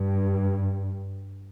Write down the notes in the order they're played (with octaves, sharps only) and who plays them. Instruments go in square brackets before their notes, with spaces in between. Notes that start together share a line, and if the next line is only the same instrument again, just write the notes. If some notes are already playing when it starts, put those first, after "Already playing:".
Already playing: [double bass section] G2